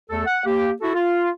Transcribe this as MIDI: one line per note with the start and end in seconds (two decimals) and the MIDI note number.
0.10 0.23 40
0.10 0.23 57
0.10 0.23 69
0.26 0.45 78
0.46 0.71 58
0.46 0.71 67
0.82 0.92 64
0.82 0.92 66
0.82 0.92 69
0.95 1.29 65